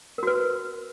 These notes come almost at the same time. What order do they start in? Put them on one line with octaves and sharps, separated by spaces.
A#4 F#4 B4